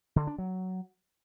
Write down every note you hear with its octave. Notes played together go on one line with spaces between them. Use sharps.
D3
D4
F#3